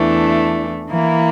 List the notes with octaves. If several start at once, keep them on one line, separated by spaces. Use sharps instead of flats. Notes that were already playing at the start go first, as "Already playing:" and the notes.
Already playing: E2 E3 A3 D4
E3 A#3 E4